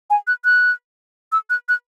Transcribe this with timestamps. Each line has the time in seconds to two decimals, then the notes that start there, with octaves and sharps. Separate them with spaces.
0.10 G#5
0.27 F#6
0.45 F#6
1.32 E6
1.50 F#6
1.69 F#6